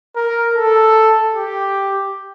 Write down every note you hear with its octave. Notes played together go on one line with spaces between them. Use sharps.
A#4
A4
G4